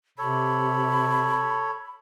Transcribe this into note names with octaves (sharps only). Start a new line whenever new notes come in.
C3 A4 C#5 B5